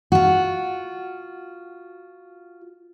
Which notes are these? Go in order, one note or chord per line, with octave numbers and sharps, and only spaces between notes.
F4 F#4